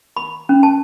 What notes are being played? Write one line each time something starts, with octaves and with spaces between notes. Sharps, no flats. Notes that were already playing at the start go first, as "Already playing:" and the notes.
B5
C#4
A5